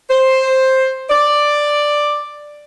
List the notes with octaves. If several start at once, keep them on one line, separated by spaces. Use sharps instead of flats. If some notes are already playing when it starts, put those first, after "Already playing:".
C5
D5